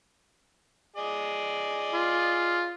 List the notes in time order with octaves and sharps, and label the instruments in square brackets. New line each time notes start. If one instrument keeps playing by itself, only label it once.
[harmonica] G#4 D5 D#5
[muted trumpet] F4